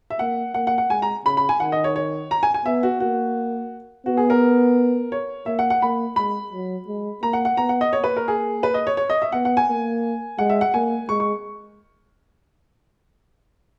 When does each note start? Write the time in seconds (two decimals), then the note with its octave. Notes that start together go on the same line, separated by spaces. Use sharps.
0.10 E5
0.19 A#3 F#5
0.54 A#3 F#5
0.67 F#5
0.78 F#5
0.90 G#3 G#5
1.02 A#5
1.25 C#3 B5
1.37 B5
1.49 G#5
1.60 D#3 F#5
1.72 D#5
1.84 C#5
1.96 C#5
2.31 A#5
2.43 G#5
2.54 G#5
2.66 B3 E5
2.83 F#4
3.00 A#3 F#4
4.06 B3 F#4
4.17 G#4
4.30 A#4
5.12 C#5
5.46 A#3 E5
5.59 F#5
5.70 F#5
5.82 A#3 B5
6.16 G#3 B5
6.52 F#3
6.87 G#3
7.22 A#3 A#5
7.33 F#5
7.45 F#5
7.57 B3 A#5
7.69 F#5
7.81 D#5
7.93 A#3 C#5
8.04 B4
8.16 A#4
8.28 G#4
8.63 B4
8.74 D#5
8.87 C#5
8.97 C#5
9.10 D#5
9.22 E5
9.32 B3 F#5
9.45 F#5
9.57 G#5
9.68 A#3
10.38 G#3 F#5
10.50 E5
10.61 F#5
10.74 A#3 G#5
11.08 G#3 C#6
11.20 C#6